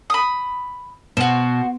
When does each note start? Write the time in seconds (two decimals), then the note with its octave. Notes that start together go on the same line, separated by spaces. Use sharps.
0.10 B5 D#6
1.17 B2 F#4 C5